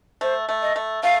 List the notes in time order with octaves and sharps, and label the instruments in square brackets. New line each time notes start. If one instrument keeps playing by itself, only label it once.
[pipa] A3 [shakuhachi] C5
[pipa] A3
[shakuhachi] D#5
[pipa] A3
[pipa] A3 [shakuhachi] F5